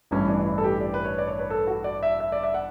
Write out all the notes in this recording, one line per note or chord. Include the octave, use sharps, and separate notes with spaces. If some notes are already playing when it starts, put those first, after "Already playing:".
A1 G2 E3 C#4
D4
E4
A4
G4
D5
B4
C#5
D5
C#5
B4
A4
F#4
D5
E5
E5
D5
E5
F#5